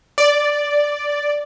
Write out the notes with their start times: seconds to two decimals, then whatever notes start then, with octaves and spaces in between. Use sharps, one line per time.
0.18 D5